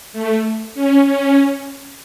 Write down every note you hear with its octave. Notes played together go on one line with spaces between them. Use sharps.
A3
C#4
C#4